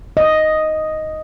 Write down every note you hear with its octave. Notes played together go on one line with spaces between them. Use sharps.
D#5